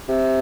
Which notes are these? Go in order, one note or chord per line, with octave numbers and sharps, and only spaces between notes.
C3